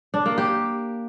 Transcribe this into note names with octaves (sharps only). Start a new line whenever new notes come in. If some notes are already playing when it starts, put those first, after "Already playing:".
D4
A#3
G4